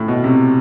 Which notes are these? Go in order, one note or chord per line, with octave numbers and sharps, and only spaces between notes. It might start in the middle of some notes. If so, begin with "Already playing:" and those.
Already playing: A2
B2
C3